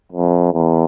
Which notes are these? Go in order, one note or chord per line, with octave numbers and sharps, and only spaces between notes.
F2
E2